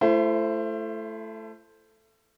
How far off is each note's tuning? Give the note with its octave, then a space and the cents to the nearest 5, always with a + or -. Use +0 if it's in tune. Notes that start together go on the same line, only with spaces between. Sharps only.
A3 +0 E4 +35 C5 +0